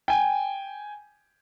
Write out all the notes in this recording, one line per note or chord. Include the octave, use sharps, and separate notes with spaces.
G5 G#5